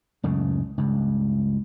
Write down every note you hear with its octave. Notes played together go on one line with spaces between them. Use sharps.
C#2 F#2 A2 C#3
C#2 G2